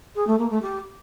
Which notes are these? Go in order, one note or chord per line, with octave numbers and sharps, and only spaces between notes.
G#4
A3
A#3
A3
G4